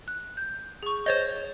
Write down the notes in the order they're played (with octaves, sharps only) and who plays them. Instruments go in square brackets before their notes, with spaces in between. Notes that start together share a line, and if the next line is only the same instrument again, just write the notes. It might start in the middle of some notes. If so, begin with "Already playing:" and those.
[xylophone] F#6
G6
G#4 C#6
[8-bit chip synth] C5 C#5 D#5 [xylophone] G6 A6